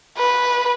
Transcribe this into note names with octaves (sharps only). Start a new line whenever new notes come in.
B4